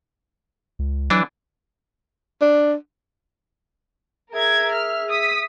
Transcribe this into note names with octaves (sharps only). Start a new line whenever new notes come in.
C#2
E3 F#3 D4
D4
G#4 A#4 E5 G#6
F6
D#6 B6